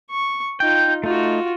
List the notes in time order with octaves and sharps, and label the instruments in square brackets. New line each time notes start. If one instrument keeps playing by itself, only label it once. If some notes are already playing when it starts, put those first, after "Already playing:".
[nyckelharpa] C#6
[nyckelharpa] D#4 F4 [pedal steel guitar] G5
[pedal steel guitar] A3 D#4 [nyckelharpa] F4 F#4